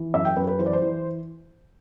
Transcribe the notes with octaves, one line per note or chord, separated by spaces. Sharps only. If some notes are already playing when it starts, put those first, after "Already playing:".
Already playing: E3
F#2 E5
G5
F#2 B4
B4
E3 C5
D5
C5
E3